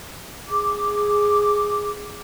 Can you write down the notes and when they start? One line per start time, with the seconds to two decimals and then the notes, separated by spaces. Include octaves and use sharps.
0.48 G#4 D6